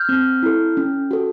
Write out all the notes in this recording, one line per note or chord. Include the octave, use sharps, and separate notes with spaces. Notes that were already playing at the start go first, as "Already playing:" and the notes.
Already playing: F6 G6
C4
E4 A4
C#4
F#4 A4